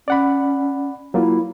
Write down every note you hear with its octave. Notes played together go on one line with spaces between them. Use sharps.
C#4 D5 F#5 B5
F#3 A#3 E4 F4